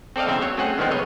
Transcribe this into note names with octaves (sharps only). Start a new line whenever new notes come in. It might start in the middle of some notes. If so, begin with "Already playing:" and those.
C4 A4 D5 D#5 F5
B1 E2 C#3 C4 C5 E5
F#3 C#5
A3 C4 C#4 G#4 C5 F#5
D3 D#3 F3 G#3 B3 C4
B1 C#5 D#5